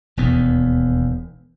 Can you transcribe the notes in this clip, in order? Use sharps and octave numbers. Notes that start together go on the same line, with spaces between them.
E1 D#2 B3